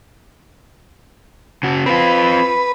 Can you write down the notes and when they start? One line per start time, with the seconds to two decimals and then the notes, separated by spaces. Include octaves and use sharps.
1.63 C#3 F#4
1.86 C4 F4 B4